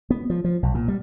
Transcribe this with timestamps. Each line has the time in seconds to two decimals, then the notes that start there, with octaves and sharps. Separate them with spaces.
0.10 B3
0.30 F3
0.44 F3
0.63 B1
0.75 A#2
0.88 G3